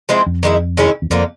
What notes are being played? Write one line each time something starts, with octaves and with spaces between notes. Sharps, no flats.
F3 G#3 C4 E4
F2
D#3 G#3 C#4 E4
D#3 G#3 C#4 E4
E2
F2 D3 F3 A#3